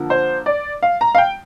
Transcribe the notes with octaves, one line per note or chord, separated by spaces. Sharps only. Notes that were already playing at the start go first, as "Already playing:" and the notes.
Already playing: D3 F3 A#3
C5
D5
F5
A#5
F5
G5